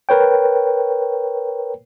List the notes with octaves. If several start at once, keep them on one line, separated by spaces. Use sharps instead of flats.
A#4 B4 C#5 G5